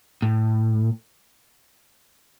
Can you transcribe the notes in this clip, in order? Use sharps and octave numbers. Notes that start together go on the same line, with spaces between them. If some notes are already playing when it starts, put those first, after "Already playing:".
A2